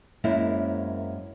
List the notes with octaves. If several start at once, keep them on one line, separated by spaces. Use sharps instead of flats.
F#2 G#3 A#3 C4 E4